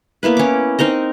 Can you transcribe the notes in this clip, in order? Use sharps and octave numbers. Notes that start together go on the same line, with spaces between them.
A#3 B3 E4 B4
C#4 D6
C4 D#4 A#4 D#5